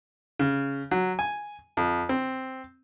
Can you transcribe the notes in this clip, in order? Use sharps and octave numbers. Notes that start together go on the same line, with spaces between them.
C#3
F#3
G#5
F2
C4